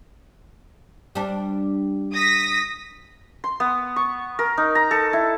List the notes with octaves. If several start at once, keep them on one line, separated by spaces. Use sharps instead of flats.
G3 D4
D#6 A#6 B6
C6
B3
C#6
A#4
D#4
A#5
A4
E4